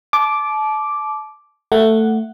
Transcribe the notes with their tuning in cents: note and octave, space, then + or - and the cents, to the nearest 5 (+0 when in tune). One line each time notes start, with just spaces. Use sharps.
A5 -30 D6 +0
A3 +10 F#5 +0